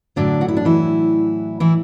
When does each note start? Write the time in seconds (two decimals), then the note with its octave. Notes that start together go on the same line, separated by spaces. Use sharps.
0.16 A2 D3 F#3 D4
0.41 F#4
0.48 E4
0.57 D4
0.65 E3 E4
1.60 E3 E4